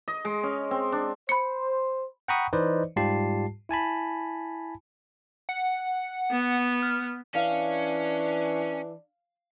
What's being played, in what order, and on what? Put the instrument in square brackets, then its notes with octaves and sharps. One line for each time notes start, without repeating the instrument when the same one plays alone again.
[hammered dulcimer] D#5
G#3
C#4
C4
D4
[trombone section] C5 [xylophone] B5 C#7
[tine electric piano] F#5 G5 A#5 B5 C#6 D#6
E3 D#4 B4 C5 D5 D#5
G#2 G3 F4 G4 A5 C7
E4 G#5 A5 B5
[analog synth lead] F#5
[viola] B3
[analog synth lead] F6
[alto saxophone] E3 [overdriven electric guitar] C#4 [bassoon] D4 [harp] F5